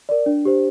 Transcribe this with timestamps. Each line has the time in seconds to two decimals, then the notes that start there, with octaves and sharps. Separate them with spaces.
0.09 A#4 D5
0.26 D4
0.45 G4 C5